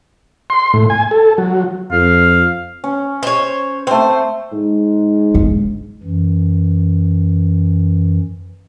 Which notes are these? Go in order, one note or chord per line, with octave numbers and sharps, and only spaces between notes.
C6
A2
G#5
A4
F#3
F2 F5
C#4
C5 C#5
A3 C4 C5
G#2
G1 G#3
F#2 E3